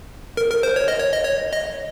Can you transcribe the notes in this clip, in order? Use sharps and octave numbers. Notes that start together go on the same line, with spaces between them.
A#4
A#4
C5
C#5
D#5
C#5
D#5
C#5
D#5